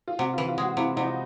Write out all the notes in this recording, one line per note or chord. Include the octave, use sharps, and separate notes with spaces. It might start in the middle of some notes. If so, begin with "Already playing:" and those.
F4
C3 F#4
F4
E3
F4
G#3 F#4
C3 E4
C3 D#4